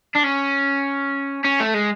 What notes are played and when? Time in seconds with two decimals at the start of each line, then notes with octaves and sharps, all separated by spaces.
0.15 D4
0.24 C#4
1.44 C#4
1.60 A3
1.74 G#3